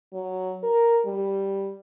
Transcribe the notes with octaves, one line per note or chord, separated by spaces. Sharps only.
F#3
A#4
G3